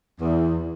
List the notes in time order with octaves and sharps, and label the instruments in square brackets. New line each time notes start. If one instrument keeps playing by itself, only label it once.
[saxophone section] E2